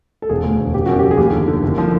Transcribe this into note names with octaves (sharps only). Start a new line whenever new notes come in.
A4
E1 G#4
D2
E1
F#1 G4
F#2 F#4
G4
F3
G#4
D#2 G4
D3
D3
F#1
F3